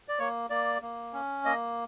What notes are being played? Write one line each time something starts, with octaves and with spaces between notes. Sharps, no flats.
D5
A#3 C#5
A#3 D5
A#3
C#4
A#3 D#5